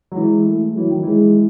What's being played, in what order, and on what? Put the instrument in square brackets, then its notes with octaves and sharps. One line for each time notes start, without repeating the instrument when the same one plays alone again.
[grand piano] F#3
[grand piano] E3 [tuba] G#3
[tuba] A3
[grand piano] E3 [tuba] F#3
[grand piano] D#3
[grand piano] E3 [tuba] G#3